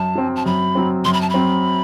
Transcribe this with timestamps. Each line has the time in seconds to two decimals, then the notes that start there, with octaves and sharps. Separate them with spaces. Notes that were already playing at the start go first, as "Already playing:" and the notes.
Already playing: F#2 A5
0.15 F#3 C4
0.36 A5
0.46 F#2 B5
0.75 F#3 C4
1.05 F#2 C6
1.13 B5
1.21 A5
1.30 F#3 C4 B5